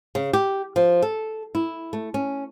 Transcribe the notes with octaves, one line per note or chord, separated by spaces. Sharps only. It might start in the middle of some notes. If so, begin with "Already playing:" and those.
C#3
G4
F3
A4
E4
A3
C#4